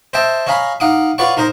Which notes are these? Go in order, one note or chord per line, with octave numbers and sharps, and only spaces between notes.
C5 D#5 E5 G5 A5
C#5 D#5 F5 G#5 A#5 B5
D#4 F5 F#5 D6 D#6
F4 B4 C#5 D5 F#5 C#6
D#4 A#4 C5 D#5 A#5